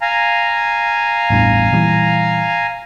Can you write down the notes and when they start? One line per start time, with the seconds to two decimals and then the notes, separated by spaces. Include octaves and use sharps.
0.01 F5 G#5 A#5
1.30 A1 E2 G2
1.73 A#2 E3 G3